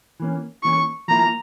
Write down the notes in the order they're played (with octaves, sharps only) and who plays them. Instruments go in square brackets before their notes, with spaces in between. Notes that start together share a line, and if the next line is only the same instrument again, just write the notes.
[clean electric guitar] E3 A#3 C#4
[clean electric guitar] E3 A#3 C#4 [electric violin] C#6
[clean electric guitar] F3 A#3 E4 [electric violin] A#5